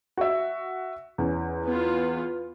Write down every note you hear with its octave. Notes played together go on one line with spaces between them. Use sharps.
F#4 E5
E2 C#4
B3 F4